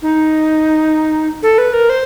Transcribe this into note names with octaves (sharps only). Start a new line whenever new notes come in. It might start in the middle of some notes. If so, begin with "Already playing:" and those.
D#4
A4
B4
A#4
C5